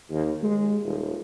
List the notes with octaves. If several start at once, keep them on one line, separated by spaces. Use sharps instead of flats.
D#2
G#3
D#1